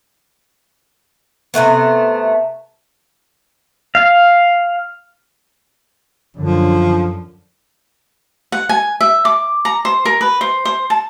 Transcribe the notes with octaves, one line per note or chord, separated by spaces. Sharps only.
C3 E3 A3 B3
F5
F#2 D3 F3
F#5
G#5
E5
D6
A#5
C5
A#4
B4
C5
C5
A5